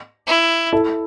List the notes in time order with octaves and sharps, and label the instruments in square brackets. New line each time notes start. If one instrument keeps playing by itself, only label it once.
[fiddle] E4
[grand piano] E4 A4